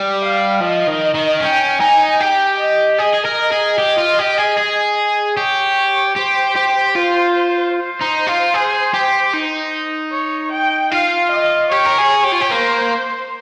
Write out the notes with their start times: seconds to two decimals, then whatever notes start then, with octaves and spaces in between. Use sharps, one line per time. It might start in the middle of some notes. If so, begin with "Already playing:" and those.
Already playing: G3
0.21 F5
0.61 F3 D#5
0.88 D#3
1.15 D#3
1.40 C#4 G5
1.80 D#4 G#5
2.20 G4 G5
2.60 D#5
2.99 G#4 D#5
3.14 G#4
3.25 A#4
3.38 D#5
3.52 G#4
3.78 G4
3.98 F4
4.19 G4
4.38 G#4
4.57 G#4
5.37 G4 C#5
6.16 G4 C5
6.56 G4
6.95 F4 C5
7.74 C5
8.01 D#4
8.27 F4
8.54 G#4
8.94 G4
9.34 D#4
10.12 C#5
10.52 G5
10.92 F4 F5
11.32 D#5
11.71 G4 C#5
11.86 A#4
11.98 G#4
12.24 G4
12.32 F4
12.41 G4
12.51 A#3 C5